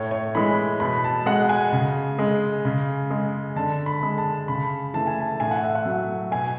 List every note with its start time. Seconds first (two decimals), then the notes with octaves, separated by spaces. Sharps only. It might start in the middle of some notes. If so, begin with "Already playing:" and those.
Already playing: A2 C#5
0.11 C#5
0.35 E3 G#3 B5
0.80 B2 B5
1.04 A5
1.26 G#3 F#5
1.49 G#5
1.72 C#3
2.19 G#3
2.65 C#3
3.10 G#3
3.56 D3 A5
3.86 B5
4.03 G#3
4.18 A5
4.48 C#3 B5
4.94 E3 A3 A5
5.07 G#5
5.21 A5
5.40 A2 G#5
5.51 F#5
5.63 E5
5.75 F#5
5.85 F#3 A3
6.31 B2 G#5